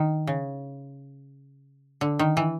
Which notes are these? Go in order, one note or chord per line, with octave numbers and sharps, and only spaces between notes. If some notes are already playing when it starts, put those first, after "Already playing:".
Already playing: D#3
C#3
D3
D#3
E3